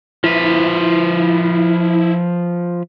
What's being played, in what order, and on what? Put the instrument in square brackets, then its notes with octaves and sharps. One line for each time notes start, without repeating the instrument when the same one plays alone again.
[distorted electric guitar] F3 B4 [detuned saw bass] E4